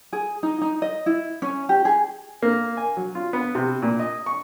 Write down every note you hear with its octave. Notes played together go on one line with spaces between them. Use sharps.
G#4
D#4
D#4
D#5
E4
C#4
G4
G#4
A#3
G#5
F#3
F4
B3
C3
A#2
D#5
C#6